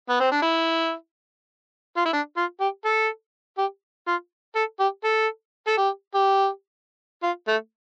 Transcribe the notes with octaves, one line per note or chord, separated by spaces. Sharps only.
B3
C4
D4
E4
F4
E4
D4
F4
G4
A4
G4
F4
A4
G4
A4
A4
G4
G4
F4
A3